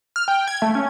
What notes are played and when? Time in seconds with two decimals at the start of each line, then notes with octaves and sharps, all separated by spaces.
0.16 F6
0.28 G5
0.48 G#6
0.62 A3
0.75 C#4